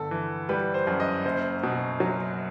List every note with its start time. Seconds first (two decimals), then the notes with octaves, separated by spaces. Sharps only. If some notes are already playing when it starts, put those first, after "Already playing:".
Already playing: G1 A4
0.11 E3
0.49 G3 B4
0.74 C5
0.87 F#2
1.00 D#5
1.25 F#1 C5
1.63 B2
2.00 F#3